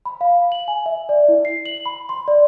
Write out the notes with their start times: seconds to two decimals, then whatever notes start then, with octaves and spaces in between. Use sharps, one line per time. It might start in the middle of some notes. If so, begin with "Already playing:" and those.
0.05 B5
0.21 F5
0.52 F#7
0.68 G#5
0.86 E5
1.09 D5
1.28 E4
1.45 C7
1.66 F#7
1.86 B5
2.09 C6
2.28 D5